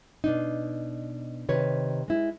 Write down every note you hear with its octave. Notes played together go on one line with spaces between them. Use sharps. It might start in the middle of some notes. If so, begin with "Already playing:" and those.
B2 D4 D#4
C3 D#3 B4 C#5
G#3 E4